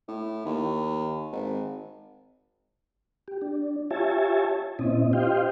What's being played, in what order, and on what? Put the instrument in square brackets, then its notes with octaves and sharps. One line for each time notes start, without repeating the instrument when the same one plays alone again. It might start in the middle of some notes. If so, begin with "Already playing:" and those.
[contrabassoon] A2
D#2
G#1
[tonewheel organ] G4
D4
F4 G4 C#5 E5 G#5 A5
A#2 C4 C#4 E4 D#5
F4 G4 C5 D#5 F5 G5